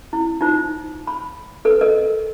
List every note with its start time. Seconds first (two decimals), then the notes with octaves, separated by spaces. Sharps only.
0.13 E4
0.41 D#4 F4 C5
1.07 B5
1.65 A4 B4
1.81 A4 A#4 D#5